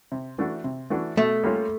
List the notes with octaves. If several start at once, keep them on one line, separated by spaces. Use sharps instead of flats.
C3
E3 A3 D4 F#4
C3
E3 A3 D4 F#4
B2 A3
G3 A#3 C#4 F4